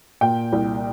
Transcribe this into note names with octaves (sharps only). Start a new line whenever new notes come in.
A#2 G5
C2